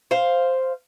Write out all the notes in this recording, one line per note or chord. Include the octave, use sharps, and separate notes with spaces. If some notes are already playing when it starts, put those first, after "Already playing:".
C5 F5